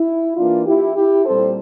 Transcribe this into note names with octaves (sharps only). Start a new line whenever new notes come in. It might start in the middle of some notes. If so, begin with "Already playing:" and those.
Already playing: E4
E3 A#3 D4 F4
E4 G4
E4 G4
A#2 G3 C4 A4 C5